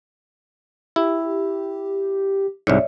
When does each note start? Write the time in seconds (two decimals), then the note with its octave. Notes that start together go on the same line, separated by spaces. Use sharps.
0.96 E4 G4
2.67 C2 G#2 C#5 D5 E5